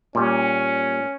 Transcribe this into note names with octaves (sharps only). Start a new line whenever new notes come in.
A#2 G3 C#4